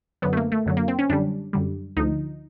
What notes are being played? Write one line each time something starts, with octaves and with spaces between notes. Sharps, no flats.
F#2 D3 F#3 B3
A3
A#3
A3
F#2 D3 F#3
A#3
C4
C#4
F#2 D3 G3 D4
F#2 D3 G3
D2 D3 F3 D#4